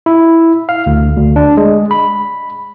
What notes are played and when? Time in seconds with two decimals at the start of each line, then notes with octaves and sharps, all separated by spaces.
0.06 E4
0.69 F5
0.86 D2
1.17 D2
1.36 D4
1.57 G#3
1.91 B5